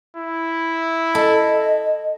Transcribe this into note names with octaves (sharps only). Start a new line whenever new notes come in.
E4
A4 D#5